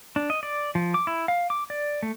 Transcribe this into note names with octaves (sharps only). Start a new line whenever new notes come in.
D4
D#5
D5
F3
D6
E4
F5
D6
D5
A3